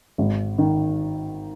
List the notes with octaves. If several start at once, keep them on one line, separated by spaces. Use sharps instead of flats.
G#1
D#3